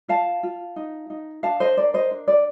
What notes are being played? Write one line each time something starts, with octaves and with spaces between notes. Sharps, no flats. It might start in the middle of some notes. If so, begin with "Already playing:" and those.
F4 F5 A5
F4
D#4
D#4
D4 F5 A5
C5 D#5
A#4 D5
C5 D#5
D4
D5